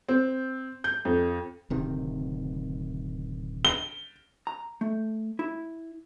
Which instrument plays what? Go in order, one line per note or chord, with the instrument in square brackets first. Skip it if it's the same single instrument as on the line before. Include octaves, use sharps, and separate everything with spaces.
[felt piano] C4
G6
F2
[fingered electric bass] D1 C3 D#3
[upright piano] G7
[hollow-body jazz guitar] A#5
A3
E4